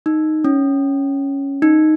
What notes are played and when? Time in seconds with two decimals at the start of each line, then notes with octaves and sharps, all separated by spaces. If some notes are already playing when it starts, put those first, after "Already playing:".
0.06 D#4
0.44 C#4
1.62 D#4